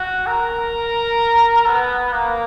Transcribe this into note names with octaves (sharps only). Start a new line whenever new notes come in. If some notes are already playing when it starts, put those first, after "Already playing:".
Already playing: F#4
A#4
B3
A#3